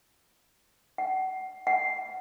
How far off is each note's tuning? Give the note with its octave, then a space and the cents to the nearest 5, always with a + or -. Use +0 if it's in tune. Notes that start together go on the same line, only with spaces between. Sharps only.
F#5 +30
F#5 +20